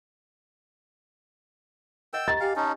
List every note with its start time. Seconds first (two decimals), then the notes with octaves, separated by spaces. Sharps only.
2.13 A#4 D#5 F#5 G5 E6
2.28 G4 D#5 A#5 A6
2.41 G4 F5 G5 G#5
2.56 C#4 D#4 A5